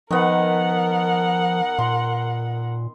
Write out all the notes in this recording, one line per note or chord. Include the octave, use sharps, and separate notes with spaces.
D#3 F3 B3 A#4 F#5
A#2 C6